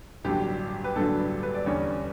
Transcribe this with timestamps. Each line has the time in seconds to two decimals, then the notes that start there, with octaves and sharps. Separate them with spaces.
0.24 A1 G2 D3 F#3 G4
0.84 B4
0.95 A1 G2 D3 F#3 A4
1.19 B4
1.43 B4
1.54 D5
1.66 E2 D3 G3 C#4 C#5